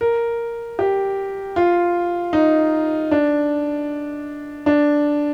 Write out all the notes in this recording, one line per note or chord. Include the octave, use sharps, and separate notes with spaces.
A#4
G4
F4
D#4
D4
D4